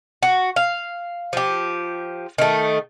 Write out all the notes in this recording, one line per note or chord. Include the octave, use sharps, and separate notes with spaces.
F#4
F5
F3 G4
D#3 A3